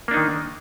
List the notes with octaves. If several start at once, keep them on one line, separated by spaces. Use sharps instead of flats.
D#3 A#3 D4 D#4